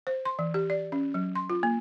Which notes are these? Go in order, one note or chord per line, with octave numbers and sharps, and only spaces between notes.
C5
C6
E3
G4
D5
C#4
F#3
C6
F4
A#3